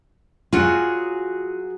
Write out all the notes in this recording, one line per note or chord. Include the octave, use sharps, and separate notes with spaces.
F#3 F4 F#4 G#4